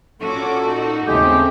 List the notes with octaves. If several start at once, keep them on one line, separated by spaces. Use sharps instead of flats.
A#2 C#4 F#4 A4 D6
D#4
D#2 C#3 G#3 A3 C4 C#4 G4